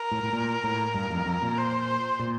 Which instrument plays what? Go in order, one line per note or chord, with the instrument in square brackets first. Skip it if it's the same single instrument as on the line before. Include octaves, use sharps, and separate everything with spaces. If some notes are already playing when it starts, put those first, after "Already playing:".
Already playing: [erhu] A#4
[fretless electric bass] A2
A2
A#2
A2
G2
F2
F2
A#2
[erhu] C5
[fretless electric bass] A#2